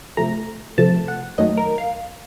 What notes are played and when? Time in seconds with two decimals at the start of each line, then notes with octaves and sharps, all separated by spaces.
0.17 C3 F3 A3 A#5
0.78 C3 F3 A3 A5
1.08 F#5
1.38 F#2 D#3 F#3 A3 D#5
1.57 A#4
1.78 F5